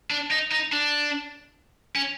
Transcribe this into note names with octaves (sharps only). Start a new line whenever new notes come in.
D4
D#4
D#4
D4
C#4